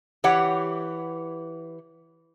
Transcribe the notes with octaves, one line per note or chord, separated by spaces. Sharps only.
E3 G4 C#5 F#5